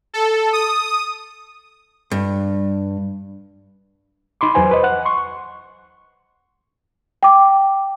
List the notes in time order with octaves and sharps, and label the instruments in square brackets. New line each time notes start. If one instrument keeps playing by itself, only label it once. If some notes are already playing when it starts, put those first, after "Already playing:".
[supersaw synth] A4
D#6
[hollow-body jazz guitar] G2
[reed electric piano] D#4 B5 C6 D6
E2 F#3 B4 C5 G#5 C6
B4 C5 D#5
F#5 F#6
C6 C#6
[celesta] G5 D6